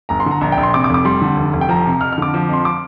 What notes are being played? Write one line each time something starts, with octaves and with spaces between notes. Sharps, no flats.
G1 A#5
C6
D3 A#5
A#1 A#5
G5
A#1
C6
C3 D6
D6
F1
D6
G3 C6
D3
F1
F1
G5
F3 A#5
C3
F2 F6
F6
D3 D6
F3
F2 C6
D6